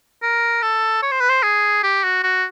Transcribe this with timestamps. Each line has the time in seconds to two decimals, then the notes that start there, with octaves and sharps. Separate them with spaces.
0.22 A#4
0.62 A4
1.02 C#5
1.11 C5
1.20 B4
1.29 C5
1.43 G#4
1.83 G4
2.04 F#4
2.23 F#4